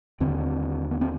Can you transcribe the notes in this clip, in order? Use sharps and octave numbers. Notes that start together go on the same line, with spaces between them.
D#2 D3 C4
B3
C4